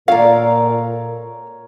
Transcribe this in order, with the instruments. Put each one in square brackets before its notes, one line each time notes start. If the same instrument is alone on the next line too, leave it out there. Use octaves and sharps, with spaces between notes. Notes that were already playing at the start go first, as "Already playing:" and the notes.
[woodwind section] A#2 [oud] A4 D5 [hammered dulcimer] A#4 C#5 [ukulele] F5